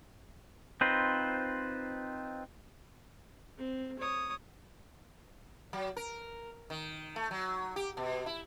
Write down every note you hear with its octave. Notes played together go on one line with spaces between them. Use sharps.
C4 D#4 F4 B4 C5
C4
C#5 D#6
F#3
A#4
D#3
A3
F#3
G4
B2
E4